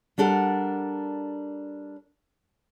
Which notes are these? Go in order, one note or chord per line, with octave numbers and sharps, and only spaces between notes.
G3 D4 A4 A#4 F#5